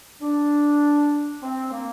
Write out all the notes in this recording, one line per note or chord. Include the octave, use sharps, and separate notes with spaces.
D4
C4
A#3